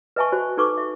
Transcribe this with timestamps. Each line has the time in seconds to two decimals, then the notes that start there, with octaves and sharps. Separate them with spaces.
0.16 B4 D#5 E5 G#5 A5 C#6
0.32 F#4 C5
0.57 D#4 A4 B4 C#6 D6
0.78 E5